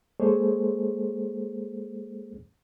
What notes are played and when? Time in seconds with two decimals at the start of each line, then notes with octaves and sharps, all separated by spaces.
0.20 G#3 A#3 G#4 A4 C5 C#5